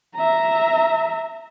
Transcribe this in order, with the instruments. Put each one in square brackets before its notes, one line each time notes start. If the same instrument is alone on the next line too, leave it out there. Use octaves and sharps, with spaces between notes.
[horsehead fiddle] E5 A#5